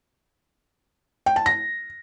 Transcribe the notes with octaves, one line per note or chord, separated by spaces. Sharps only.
G5
A5
A#6